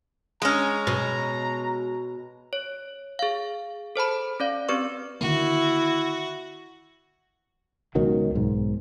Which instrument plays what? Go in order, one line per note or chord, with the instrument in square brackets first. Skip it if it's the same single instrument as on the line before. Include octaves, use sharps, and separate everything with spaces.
[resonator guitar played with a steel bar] G#3 C#4 [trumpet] A#5
[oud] B2
[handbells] C#5
G#4 F5
A4 C5 A5 B5
C#4 D5 F5
C4 G4 B4 D5 C#6
[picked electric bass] D3 D#3 A#3 [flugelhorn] E4 [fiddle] F#4
[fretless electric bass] C#2 B2 D#3 F#3
B1 G#2